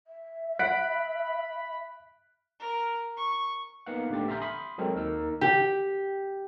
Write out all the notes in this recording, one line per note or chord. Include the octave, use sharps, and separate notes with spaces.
E5
F#5 B5 F#6 B6 D7
A#4
C#6
A#3 B3 D#4 F5 F#5
A1 D3 A3 G4 A6
E5 G#5 A#5 C6 F6 G6
B5 C6 D#6
F#3 G#3 C4 A4 A#4
D#2 D#4 A#4 E6
G4